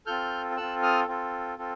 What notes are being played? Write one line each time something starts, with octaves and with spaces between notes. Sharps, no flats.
C4 F4 A4 F6 G6
C4 F4 A4 E6 F#6
D#6 F6
C4 F4 A4
C4 F4 A4